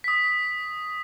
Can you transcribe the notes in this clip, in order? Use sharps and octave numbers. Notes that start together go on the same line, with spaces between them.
D#6 B6